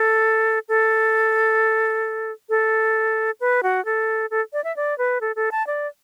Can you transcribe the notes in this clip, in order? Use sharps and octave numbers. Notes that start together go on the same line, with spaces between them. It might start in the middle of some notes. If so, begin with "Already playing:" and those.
Already playing: A4
A4
A4
B4
F#4
A4
A4
D5
E5
D5
B4
A4
A4
A5
D5